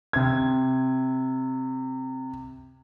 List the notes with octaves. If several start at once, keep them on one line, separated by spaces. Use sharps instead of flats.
C3 G#6